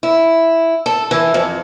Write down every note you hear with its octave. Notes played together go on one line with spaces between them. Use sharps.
E4
A4
E3
F2